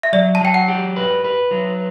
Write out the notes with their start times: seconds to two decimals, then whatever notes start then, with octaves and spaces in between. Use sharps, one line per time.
0.03 E5
0.13 F#3 D5
0.35 A5
0.41 F#3 G5
0.54 F#5
0.68 G4
0.96 B4
1.24 B4
1.51 F#3